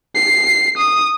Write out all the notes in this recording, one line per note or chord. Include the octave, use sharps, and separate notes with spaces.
C7
D#6